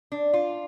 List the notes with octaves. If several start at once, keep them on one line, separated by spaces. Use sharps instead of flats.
D4
F4